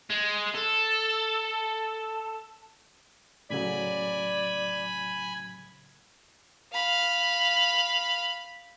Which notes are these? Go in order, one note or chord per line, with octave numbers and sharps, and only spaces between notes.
G#3
A4
A2 C#3 F#3 D5 G#5 B5
F5 B5